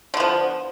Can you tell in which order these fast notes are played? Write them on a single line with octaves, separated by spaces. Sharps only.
D3 B3 F3